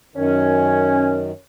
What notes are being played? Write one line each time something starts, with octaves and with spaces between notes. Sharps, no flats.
F#2 D#3 C#4